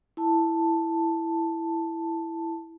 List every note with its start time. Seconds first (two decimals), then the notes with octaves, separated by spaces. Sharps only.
0.17 E4 A5